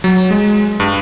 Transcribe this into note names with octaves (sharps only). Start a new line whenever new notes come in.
F#3
G#3
G2